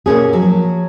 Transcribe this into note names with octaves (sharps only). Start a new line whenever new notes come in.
B2 A#3 C#4 G#4
F3 F#3